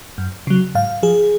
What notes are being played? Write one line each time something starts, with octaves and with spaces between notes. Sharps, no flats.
F#2
C#3 F#3
G#2 F5
F3 G#4